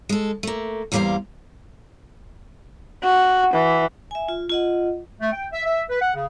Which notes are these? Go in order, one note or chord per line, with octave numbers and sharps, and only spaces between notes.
G#3 A4
A3 A#3
E2 G3 A#3 B4 C5 F5
F#4
E3
E5 G#5
F4
F4 D#5 F#5
A3
G5
E5
E5
B4
F#5
C#3